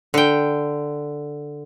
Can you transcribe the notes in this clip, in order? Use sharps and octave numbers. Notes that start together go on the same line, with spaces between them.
D3 G5